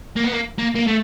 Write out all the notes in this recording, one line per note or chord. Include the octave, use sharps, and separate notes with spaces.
A#3
B3
A#3
A#3
A#3
A3